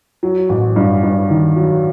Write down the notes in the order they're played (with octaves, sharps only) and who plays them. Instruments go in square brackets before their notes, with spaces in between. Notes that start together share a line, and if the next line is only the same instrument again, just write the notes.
[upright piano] F#3
A1
G2
G2
D#3
F#3